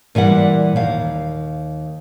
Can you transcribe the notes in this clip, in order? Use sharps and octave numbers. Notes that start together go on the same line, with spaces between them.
A#2 E3 G3 F#5
D#2 F5